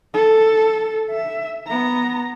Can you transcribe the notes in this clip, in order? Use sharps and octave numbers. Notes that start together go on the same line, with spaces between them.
A4
E5
B3 A#5